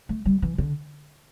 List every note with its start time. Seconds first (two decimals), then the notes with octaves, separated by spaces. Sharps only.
0.09 A3
0.25 G3
0.42 E3
0.58 D3